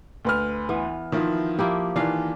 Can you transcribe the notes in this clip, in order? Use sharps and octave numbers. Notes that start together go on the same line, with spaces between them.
D2 B4 F6
E3 B3
D#3 F3 E4
F3 A#3 E4 G4
D#3 E3 D4 F4 F5